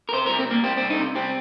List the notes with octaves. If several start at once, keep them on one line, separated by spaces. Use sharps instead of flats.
A#4
C3 C5
G3 A#4
C4
G3 A#3
G3 C4
C3 C4
D#4
C3
G3 C4